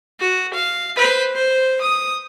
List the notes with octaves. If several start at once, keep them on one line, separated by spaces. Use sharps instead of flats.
F#4
F5
B4 C5
C5
D#6